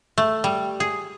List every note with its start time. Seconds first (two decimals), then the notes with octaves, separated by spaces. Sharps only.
0.18 A3
0.44 G3
0.80 G#4